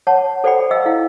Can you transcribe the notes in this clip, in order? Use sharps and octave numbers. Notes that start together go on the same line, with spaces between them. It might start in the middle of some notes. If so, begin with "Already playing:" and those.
C#5 F#5 A5
A4 C5 D5 F#5 G5 B5
D#5 F5 G5 E6
E4 F5